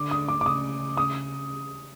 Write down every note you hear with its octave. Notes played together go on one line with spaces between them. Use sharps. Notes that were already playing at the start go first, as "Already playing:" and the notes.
Already playing: D3 D6
D#6
D6
D6
C#3 D#6
D#6